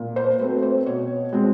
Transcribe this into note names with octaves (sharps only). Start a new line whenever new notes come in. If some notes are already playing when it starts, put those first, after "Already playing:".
Already playing: A#2
C5
F#3 A3 C4 B4
C5
B2 C#5
G#3 C4